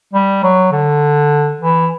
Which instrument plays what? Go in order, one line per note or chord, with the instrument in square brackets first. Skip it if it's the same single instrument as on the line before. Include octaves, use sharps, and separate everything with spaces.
[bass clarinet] G3
F#3
D3
E3